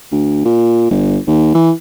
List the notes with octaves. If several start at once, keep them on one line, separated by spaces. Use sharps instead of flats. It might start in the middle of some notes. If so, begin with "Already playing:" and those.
D2
A#2
G1
D#2
E3